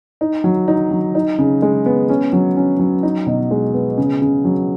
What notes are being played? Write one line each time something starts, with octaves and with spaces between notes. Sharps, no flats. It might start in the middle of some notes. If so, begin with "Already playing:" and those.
D#4
F#3
D#4
F#3
D#4
C#3
G#3
B3
C#4
F#3
C#4
F#3
D#4
B2
G#3
B3
C#3
C#3
F#3